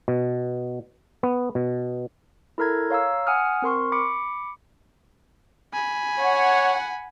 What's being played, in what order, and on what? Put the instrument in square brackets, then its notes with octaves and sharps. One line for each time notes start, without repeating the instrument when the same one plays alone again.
[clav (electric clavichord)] B2
B3
B2
[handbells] E4 A4 A#4 A#5 G#6
C#5 F5 A#5 E6
F#5 G#5 D#6 F6
C4 A#4 C6 C#6
B5 D6 C#7
[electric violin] G#5 B5
[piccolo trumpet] C#5 [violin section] F#5